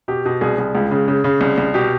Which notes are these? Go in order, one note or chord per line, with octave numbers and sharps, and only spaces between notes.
B2 G4
B2
C2 G#4
C2
C#2
C#3
C#3
C#3
C2
C2
B2 G4